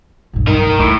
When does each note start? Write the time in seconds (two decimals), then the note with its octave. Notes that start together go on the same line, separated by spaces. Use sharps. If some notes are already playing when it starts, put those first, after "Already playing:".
0.33 B1 G2
0.48 D#4 A#4
0.61 A2
0.79 D#2 A2